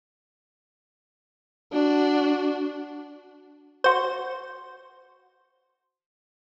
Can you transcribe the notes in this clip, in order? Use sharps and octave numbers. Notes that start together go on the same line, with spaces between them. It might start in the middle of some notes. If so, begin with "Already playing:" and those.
D4 F#4
F#4 C5